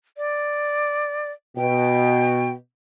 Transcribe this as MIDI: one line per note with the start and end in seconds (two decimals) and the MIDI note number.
0.17 1.31 74
1.57 2.53 47
1.57 2.51 79